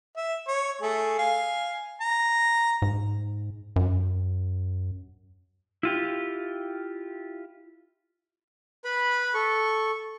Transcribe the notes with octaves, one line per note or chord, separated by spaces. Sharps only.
E5
C#5
A3 G#4
F5 G#5
A#5
G#2
F#2
E4 F4 G4
B4 B5
A4 C#6